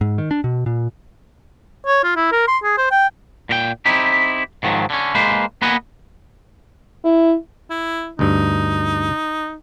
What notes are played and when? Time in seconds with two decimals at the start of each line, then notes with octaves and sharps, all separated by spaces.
0.01 G#2
0.18 D#3
0.31 D4
0.44 B2
0.66 A#2
1.86 C#5
2.04 F4
2.16 E4
2.32 A#4
2.48 C6
2.63 G#4
2.78 C5
2.91 G5
3.49 A#2 A#4 G5
3.85 C4 D#4 E4 G4
4.63 G#2 D#3 F3 F#3
4.90 D3 C#4
5.15 G#3 A#3 B4 C5
5.62 A#3 B3 B4 D#5 F#5 G#5
7.04 E4
7.70 E4
8.19 D2 G2 D#4